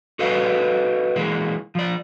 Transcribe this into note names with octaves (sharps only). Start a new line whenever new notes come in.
F#4 G4 A4 B4 D#5 F5
E3 G#3 A#3
F3 D5